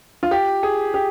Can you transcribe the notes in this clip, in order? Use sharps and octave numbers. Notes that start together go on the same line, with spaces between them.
F4
G4
G#4
G4